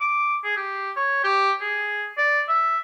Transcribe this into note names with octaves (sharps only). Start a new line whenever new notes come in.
D6
G#4
G4
C#5
G4
G#4
D5
E5